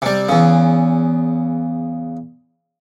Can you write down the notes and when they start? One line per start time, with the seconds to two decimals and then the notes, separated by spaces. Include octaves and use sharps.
0.02 C3 G3
0.29 E2 C#3